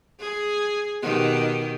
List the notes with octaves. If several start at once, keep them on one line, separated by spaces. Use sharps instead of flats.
G#4
B2 D#3 G4